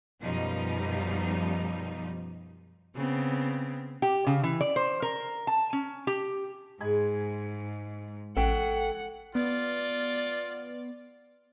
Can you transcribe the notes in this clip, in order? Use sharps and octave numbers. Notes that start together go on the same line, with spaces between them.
F#2 B2 F3 G3 D#4
C#3 B3 C4
G4
C#3
E3
D5
C5
A#4
A5
C#4
G4
G#2 G#3 G#5 B5
A1 A4 F#5 G5
B3 F4 D5